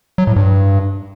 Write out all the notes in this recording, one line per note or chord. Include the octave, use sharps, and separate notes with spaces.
F#3
A2
G2